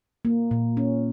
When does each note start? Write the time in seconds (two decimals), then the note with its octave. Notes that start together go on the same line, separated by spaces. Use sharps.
0.25 A#3
0.51 A#2
0.77 C#4